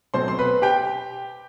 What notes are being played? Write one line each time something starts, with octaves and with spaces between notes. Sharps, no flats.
B2 F#3 A3 C4 C5 C6
C6
B4 B5
G4 G5